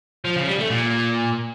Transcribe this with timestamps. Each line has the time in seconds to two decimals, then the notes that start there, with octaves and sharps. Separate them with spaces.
0.25 F3
0.36 C#3
0.48 G3
0.59 A3
0.71 A#2